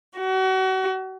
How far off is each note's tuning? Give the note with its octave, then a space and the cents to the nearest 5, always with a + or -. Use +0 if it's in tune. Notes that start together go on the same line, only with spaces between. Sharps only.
F#4 +35